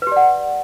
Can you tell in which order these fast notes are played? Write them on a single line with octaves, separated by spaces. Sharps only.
B4 G4 D5 F#5